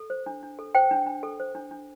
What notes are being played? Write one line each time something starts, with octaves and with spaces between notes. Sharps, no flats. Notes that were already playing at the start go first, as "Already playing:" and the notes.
Already playing: A4
C5
D4
D4
A4
C5 G5
D4
D4
A4
C5
D4
D4